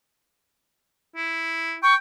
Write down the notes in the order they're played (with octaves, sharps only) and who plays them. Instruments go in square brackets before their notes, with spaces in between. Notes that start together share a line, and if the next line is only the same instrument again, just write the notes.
[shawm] E4
[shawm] G5 [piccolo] C#6